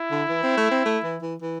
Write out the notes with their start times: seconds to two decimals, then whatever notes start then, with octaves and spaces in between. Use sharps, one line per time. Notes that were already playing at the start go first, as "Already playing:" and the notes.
Already playing: E4
0.11 D3
0.29 E3
0.43 C4
0.57 A3
0.71 C4
0.85 A3
1.04 E3
1.22 E3
1.41 E3